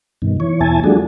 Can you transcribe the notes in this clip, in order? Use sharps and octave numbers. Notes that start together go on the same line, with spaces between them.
G2 B2 D#3
E3 C#5
E2 B2 E4 G#5 A5
F3 G3 A3 D4 F#4 G#4